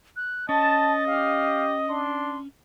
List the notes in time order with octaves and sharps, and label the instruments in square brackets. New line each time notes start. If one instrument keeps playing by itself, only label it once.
[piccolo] F#6
[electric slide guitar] C#4 [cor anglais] D#5 [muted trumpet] A5 [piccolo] A6
[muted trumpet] G4 [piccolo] F5
[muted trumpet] D4 [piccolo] C6